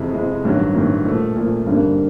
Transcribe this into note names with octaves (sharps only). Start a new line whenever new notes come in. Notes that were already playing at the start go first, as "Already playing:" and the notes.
Already playing: F2 C3 E3 G#3
F2 C3 E3 G#3
A1 G2 D#3 F#3
A1 G2 D#3 F#3
A#2 F3 A3
A#2 F3 A3
G#1 G2 D3 G3 A#3